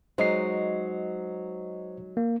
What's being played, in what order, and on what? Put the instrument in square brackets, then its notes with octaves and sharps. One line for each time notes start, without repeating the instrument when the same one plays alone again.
[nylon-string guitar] F#3 G#3 D#4 [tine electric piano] C5 D#5 C7
[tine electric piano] A#3